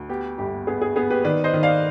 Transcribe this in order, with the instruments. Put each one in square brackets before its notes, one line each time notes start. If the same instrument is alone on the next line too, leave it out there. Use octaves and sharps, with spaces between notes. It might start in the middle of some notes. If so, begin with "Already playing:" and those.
Already playing: [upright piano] D2
B3 G4
G1 G4
B3 G#4
G#4
B3 G#4
G4 B4
D#3 B4 D5
C5 D#5
D#3
D5 F5